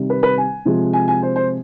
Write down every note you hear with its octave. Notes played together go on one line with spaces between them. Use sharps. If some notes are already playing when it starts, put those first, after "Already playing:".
Already playing: C3 D#3 G3
B4
B4
G#5
C3 F3 G#3
G#5
G#5
C5
C5